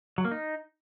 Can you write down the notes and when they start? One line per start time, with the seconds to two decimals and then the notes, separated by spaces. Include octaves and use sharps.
0.18 F#3
0.25 A#3
0.31 D#4